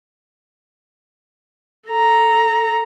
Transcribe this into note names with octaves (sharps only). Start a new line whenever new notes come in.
A4 A#5